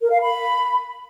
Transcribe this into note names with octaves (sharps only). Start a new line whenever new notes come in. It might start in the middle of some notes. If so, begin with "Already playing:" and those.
A#4
F5
B5